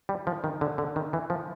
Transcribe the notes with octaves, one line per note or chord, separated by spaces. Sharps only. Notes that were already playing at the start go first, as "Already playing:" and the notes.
G3
F3
D#3
D3
D3
D#3
E3
F3